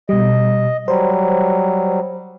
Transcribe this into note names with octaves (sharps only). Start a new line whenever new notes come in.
B2 G3 D#5
F#3 G3 C5